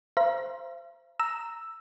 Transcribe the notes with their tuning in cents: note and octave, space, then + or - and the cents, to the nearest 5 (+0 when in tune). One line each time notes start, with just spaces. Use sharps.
C5 +0 F5 -45 A#5 +35
A#5 -5 E6 +0